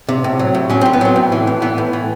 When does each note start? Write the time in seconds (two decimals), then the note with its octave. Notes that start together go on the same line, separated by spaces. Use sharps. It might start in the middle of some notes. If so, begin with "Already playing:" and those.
0.09 C3
0.24 A2
0.39 F#3
0.55 A2
0.70 F#3 C#4
0.81 A2 C4
0.93 B3
1.01 F#3 C4
1.16 A2
1.32 E3
1.47 A2
1.62 E3 B3
1.78 A2
1.93 E3